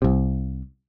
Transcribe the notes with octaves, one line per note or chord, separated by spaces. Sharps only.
C2 C3